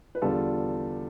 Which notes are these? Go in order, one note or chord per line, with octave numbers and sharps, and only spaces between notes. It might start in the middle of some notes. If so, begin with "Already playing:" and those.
B4
E2 D3 G3 F4 A4